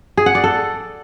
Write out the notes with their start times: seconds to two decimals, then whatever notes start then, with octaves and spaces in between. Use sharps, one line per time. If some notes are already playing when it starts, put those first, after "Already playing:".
0.17 G#4
0.26 F#5
0.35 D5
0.44 A4